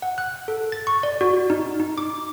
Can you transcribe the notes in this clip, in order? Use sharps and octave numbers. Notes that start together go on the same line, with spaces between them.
F#5
F#6
A4
A6
C#6
D5
F#4
D#4
D#4
D6